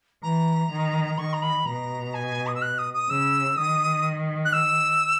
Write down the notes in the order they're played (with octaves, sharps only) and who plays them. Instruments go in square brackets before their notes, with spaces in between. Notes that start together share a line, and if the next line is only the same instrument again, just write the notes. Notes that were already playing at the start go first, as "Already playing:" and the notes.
[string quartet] E3 [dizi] A#5
[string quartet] D#3
[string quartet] D#3 [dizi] C#6
[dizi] A#5
B5
[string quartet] B2 [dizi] A#5
[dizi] G#5
D#6
E6
F#6
D#6
D#6
[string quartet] C#3 [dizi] E6
[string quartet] D#3 [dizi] D#6
[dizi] F#6
E6